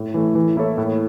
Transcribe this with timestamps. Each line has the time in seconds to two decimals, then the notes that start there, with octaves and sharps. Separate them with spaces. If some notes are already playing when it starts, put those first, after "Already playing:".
Already playing: A2
0.14 E3 A3
0.35 E3
0.57 A#3 E4 A4 C#5
0.78 A2